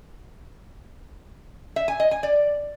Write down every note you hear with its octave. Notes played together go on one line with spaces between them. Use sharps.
E5
G#5
D#5
G#5
D5